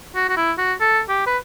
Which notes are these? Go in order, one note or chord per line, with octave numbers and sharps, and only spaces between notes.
F#4
F#4
E4
F#4
A4
G4
B4